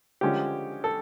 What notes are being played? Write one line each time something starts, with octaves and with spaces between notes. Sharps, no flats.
D3 F3 G#3 C#4 G4
A4